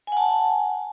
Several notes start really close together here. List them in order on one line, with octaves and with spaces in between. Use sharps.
G#5 F#5 A5